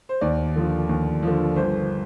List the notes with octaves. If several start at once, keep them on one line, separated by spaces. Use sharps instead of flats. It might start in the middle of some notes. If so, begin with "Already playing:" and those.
C5
D#2 D5
D3 F3
D#2
D3 F3
G1 C5